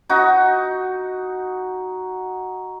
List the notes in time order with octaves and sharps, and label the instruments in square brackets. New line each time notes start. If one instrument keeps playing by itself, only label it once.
[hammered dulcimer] D#4 F#4